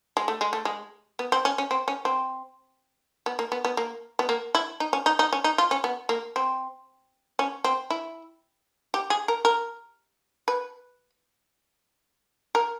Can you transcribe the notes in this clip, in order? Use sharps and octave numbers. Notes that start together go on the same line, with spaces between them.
G#3
A3
G#3
A3
G#3
B3
C4
C#4
C#4
C4
C#4
C4
B3
A#3
B3
B3
A#3
B3
A#3
E4
D#4
C#4
D#4
D#4
C#4
D#4
F4
C#4
B3
A#3
C4
C#4
C4
E4
G4
G#4
A#4
A#4
B4
A#4